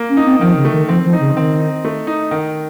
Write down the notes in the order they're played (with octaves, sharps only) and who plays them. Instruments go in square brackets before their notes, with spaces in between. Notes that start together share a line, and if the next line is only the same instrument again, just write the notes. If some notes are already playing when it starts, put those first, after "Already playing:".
Already playing: [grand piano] A#3
[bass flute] C#4
[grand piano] D#4
[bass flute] C4
[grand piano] D#3 [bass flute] F3
[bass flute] C#3
[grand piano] A3
[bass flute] D#3
[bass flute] F3 [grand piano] C4
[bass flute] F3
[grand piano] D#4
[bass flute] C#3
[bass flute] D#3 [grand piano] C4
[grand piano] D#4
A3
D#4
D#3